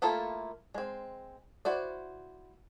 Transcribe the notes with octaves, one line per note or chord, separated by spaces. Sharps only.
A3 A#3 E4 F4 A4
G#3 C4
E4 F#4 C5 D5